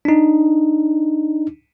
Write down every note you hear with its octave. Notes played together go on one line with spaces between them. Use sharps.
D4 D#4